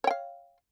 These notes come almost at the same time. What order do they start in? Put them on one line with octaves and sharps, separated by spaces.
C#5 G5 F5